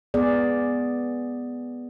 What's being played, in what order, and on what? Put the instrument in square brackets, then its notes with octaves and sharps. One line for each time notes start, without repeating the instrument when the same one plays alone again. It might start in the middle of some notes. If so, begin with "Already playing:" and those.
[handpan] B3 G#4 D5